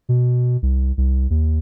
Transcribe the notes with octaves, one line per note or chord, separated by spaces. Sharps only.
B2
C2
C2
D#2